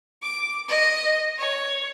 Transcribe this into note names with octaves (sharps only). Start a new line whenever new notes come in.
D6
D#5
C#5